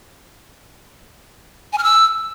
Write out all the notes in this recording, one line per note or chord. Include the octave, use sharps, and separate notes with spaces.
G#5
F6
E6